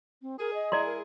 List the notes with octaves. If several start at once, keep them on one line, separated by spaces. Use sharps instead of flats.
C4
G#4 A#4
D#5
G#3 E4 G#4 D5 A#5 C6
A#4